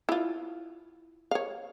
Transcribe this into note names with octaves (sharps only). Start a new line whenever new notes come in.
E4 F4
C#5 F5